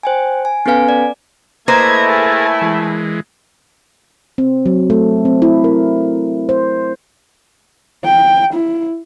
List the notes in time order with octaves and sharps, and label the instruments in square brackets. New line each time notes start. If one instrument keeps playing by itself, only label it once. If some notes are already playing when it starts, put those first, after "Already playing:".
[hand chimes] C5 G5 G#5
G#5
B3 C#4 A4 B4 F5 G#5
D5
[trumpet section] A3 E4 [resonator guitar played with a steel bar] A#3 B4 C5 [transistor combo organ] D#5 A#5 [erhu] G#6
[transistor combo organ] G#4 A#4 A5 [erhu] G#5
[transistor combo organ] E3 G#3
[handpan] C4
F#3
A3
C4
E4
A#4
C5
[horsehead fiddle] G5
E4